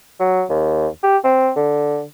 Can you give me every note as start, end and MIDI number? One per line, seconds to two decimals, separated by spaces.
0.20 0.44 54
0.50 0.88 39
1.03 1.17 67
1.24 1.51 60
1.56 2.03 50